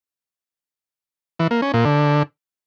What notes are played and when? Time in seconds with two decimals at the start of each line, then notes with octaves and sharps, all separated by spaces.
1.39 E3
1.51 A#3
1.62 C#4
1.74 A#2
1.85 D3